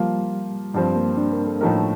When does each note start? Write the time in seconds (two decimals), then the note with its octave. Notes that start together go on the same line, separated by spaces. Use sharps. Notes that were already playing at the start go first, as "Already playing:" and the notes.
Already playing: F3 G3 A#3 F4
0.74 G2 F3 G3 C4
0.96 A#3
1.17 D4
1.33 A#4
1.46 A4
1.61 A2 F3 A3 D#4 A#4